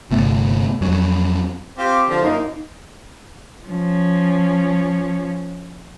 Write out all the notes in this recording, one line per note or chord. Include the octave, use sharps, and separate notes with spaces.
G1 C3 A3 B3
F2 F#3
C4 F4 G4
D3 F3
F#2 A#3 D#4
F3 C#4